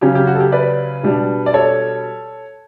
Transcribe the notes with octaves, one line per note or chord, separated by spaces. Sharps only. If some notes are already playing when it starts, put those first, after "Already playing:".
C#3 F#3 C#4 G4
G4
F#4
A4
G4
B4 D5
B2 G3 D4
D5
A4 C#5